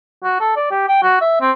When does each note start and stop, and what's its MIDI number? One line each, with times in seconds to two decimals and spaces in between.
0.24 0.38 66
0.40 0.56 69
0.57 0.66 74
0.71 0.86 67
0.88 1.01 79
1.03 1.17 66
1.21 1.36 76
1.41 1.51 60